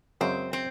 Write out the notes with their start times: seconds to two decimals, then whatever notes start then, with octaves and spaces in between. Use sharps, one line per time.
0.21 F#2 C#3 G#3 C4
0.53 C4